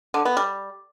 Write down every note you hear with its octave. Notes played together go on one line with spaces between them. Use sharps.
D3
B3
G3